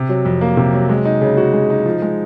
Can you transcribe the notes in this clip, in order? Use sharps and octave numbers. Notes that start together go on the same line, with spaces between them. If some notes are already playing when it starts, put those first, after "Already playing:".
Already playing: C3
F#3
F2
A#3
C3
F#3
G#3
D#4
C#3
F#4
G#3
D#4
F3
G#3